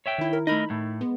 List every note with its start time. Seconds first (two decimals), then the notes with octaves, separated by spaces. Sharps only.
0.06 C#5 E5 G5
0.18 D#3 E4
0.33 A#4
0.47 A3 D#4 A#4 D#5 B5
0.70 A2 A3
1.01 G#3 B3